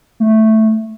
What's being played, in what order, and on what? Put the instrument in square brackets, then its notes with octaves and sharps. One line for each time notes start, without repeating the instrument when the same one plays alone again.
[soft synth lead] A3